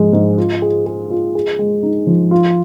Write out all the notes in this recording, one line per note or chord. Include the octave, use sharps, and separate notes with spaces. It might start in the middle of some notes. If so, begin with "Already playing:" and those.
Already playing: G#2 F3 G#3
G#2
F4
G#4
G#4
F4
G#4
G#3
D#4
F3
F4